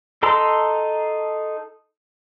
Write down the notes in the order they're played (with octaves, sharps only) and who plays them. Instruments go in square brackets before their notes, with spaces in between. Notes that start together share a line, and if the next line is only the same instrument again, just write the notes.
[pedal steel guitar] D#4 A4 A#5 C6 E6